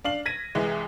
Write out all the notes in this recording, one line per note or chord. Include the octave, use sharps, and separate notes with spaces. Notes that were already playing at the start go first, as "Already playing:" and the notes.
D4 F5 F#7
G#6 A#6 B6 D#7
C2 E3 G#3